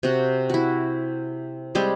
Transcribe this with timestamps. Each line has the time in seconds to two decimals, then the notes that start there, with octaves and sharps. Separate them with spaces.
0.03 C3 F#4
0.50 E4 F#4
1.75 G3 G#3 C4